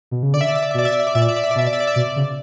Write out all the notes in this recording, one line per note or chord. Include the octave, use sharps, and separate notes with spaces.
B2
C#3
D3 D5
E5
D5
E5
D5
E5
B2 D5
E5
D5
E5
D5
A#2 E5
D5
E5
D5
E5
D5
B2 E5
D5
E5
D5
E5
B2 D5
C#3